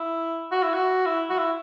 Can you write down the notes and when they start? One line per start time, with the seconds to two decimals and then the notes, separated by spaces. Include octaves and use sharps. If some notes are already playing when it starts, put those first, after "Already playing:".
Already playing: E4
0.52 F#4
0.63 E4
0.74 F#4
1.06 E4
1.30 F#4
1.39 E4